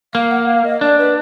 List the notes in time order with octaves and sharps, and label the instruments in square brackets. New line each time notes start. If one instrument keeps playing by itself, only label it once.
[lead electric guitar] A#3 [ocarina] F5
[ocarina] F#5
F5
D#5
[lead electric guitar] D4 [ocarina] D5
[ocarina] B4